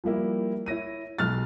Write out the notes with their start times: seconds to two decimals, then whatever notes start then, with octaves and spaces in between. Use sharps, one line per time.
0.04 F3 G3 A#3 E4
0.66 E4 C#5 A#6 D#7
1.19 B1 B2 G#3 F6 F#6 A6